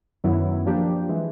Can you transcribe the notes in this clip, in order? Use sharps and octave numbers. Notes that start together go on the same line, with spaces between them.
F#2 D#3 F#3 B3 E4
F3 A#3 D4 G4
E3 G#3